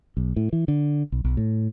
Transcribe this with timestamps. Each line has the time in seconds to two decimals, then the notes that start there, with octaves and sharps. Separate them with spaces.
0.17 B1
0.36 A2
0.53 E3
0.68 D3
1.12 B1
1.24 B1
1.37 A2